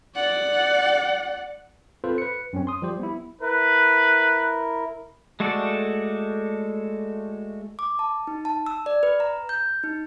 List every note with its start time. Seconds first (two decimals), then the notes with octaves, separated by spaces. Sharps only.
0.16 D5 F#5
2.04 C4 F4 A4 B4 C5
2.18 B4 C#7
2.53 F#2 C4 C#4
2.67 C6 D#6
2.82 F3 G3 G4 C5
2.99 B3 E4
3.41 E4 A#4 B4
5.40 G#3 A3 F#4 A4 D5
7.79 D6
7.99 A5
8.27 D#4
8.45 A5
8.66 E6
8.86 D5
9.03 B4
9.20 A#5
9.49 G6
9.83 D#4